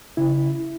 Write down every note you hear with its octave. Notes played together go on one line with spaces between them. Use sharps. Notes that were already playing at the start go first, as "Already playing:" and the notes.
C#3 E4